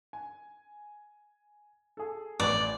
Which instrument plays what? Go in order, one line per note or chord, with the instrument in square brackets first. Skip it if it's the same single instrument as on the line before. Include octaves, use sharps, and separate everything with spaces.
[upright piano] G#5
G#4 A4
[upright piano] A1 B4 [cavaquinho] D5